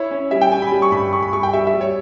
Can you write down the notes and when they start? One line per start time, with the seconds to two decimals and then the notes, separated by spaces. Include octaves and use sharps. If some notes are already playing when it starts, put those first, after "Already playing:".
Already playing: E4 C#5
0.11 C#4
0.31 G3 E5
0.41 G5
0.52 C#4 G#5
0.62 B5
0.72 G3
0.82 C#6
0.92 G2 B5
1.13 G3 C#6
1.23 B5
1.33 G3 C#6
1.43 G5
1.53 G3 E5
1.67 E5
1.74 G3
1.81 C#5